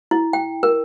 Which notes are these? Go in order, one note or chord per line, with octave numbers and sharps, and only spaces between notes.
E4
G5
A#4